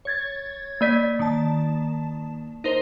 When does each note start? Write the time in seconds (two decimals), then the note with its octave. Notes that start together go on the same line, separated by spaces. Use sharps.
0.05 C#5 G#6 A6
0.81 A#3 D5 B6
1.19 D#3 A5
2.64 D#4 A#4 C5